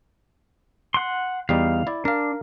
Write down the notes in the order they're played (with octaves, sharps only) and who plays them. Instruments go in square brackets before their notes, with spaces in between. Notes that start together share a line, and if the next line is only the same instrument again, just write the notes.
[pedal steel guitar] F#5 C6
[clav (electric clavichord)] E2 G3 D#4 [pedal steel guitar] F5
[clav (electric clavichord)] E4 D5
[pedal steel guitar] D4 [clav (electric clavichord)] A#4 F5